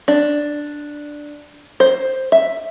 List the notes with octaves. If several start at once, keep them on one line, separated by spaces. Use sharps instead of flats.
D4
C5
E5